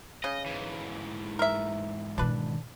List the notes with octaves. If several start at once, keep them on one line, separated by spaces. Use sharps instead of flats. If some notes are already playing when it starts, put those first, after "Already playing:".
C#3 D#5
G#2 E3
A#4 E5
B2 D#3 D4 B4